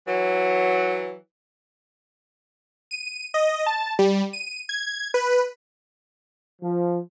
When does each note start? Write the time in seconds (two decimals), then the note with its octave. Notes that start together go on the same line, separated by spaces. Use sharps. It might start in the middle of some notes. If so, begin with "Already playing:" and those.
0.06 E3 F#3
2.91 D#7
3.34 D#5
3.66 A5
3.99 G3
4.33 D#7
4.69 G#6
5.14 B4
6.61 F3